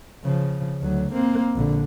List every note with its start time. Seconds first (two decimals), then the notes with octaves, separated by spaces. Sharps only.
0.24 C#3 F3
0.81 D2 F#3
1.13 A#3 C4
1.55 A#1 D3